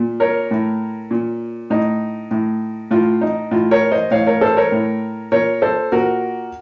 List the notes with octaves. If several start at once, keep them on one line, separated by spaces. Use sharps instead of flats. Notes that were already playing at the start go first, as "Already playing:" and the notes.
Already playing: A#2
A#4 C#5
A2
A#2
A2 D#4
A2
A2 F4
D#4
A2 F4
A#4 C#5
C5 D#5
A2 C#5 F5
A#4 C#5
A4 C5
A#4 C#5
A2
A#2 A#4 C#5
A4 C5
A#2 F#4 A#4